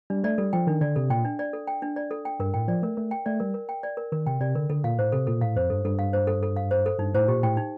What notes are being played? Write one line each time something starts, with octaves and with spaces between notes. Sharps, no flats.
G3 D4
A3 D5
G3 A4
F3 G5
D#3 D4
D3 D5
C3 A4
A#2 G5
D4
D5
A4
G5
D4
D5
A4
G5
G2 A#4
A2 G5
F3 D5
A3 A#4
A3 A#4
G5
A3 D5
G3 A#4
A#4
G5
D5
A#4
D#3 A#4
C3 G5
C3 D5
D3 A#4
D3 A4
A#2 F5
A2 C5
C3 A4
A#2 A4
A2 F5
F2 C5
G2 A4
G2 A4
F5
C5
A4
A4
F5
C5
A4
G2 D#4
A2 C5
A#2 G4
A2 G5
D#4